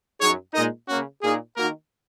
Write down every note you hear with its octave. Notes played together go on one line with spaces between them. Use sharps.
F#2 F#3 D#4 G#4 C#5
A#2 G#3 D#4 A#4 D#5
C#3 A#3 C#4 F#4
A#2 A#3 D#4 G#4
D#3 A#3 D#4 F#4 A#4